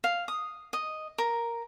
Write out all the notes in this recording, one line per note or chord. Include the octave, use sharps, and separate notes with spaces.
F5
D#6
D#5
A#4